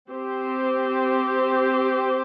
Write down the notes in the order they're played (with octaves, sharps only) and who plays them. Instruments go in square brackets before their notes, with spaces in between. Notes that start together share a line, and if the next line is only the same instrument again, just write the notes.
[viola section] C4 G4 C5